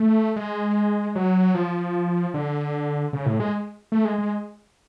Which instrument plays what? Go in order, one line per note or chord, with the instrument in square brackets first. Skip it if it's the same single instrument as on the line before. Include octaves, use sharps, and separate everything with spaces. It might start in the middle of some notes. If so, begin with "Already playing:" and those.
Already playing: [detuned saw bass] A3
G#3
F#3
F3
D3
C#3
A2
G#3
A3
G#3
G#3